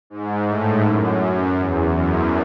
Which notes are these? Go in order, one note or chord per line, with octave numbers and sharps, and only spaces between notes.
G#2
A2
F#2
F#2
E2
F#2